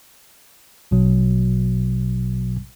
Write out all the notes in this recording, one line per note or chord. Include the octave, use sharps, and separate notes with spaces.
A#1 B2 F#3